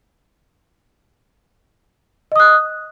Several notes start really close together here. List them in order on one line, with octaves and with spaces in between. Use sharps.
D#5 D#6 F#6